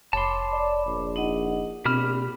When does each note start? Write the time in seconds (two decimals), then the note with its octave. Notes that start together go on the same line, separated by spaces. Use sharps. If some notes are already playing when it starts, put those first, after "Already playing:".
0.13 F1 C#5 A5 B5 C6 D6
0.53 D5
0.86 A#1
1.16 D#4 D#5 F#5
1.85 A#1 B2 C4 G4 B5 F6